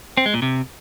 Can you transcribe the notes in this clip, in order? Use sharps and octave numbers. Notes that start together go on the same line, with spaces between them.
C4
G#3
A#2
C3